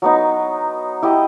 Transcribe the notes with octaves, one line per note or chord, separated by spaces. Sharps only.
F#3 B3 D#4
E4 G4 D#5